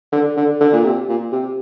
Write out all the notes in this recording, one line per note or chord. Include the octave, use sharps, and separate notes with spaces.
D3
D3
D3
A#2
C3
A#2
C3